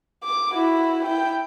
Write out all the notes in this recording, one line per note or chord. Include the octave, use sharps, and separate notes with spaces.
D6
E4 F#4
E4 G5